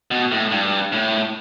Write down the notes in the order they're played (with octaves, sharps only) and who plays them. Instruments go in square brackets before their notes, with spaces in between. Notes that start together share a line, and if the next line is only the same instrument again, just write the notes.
[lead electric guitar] B2
A2
G2
A2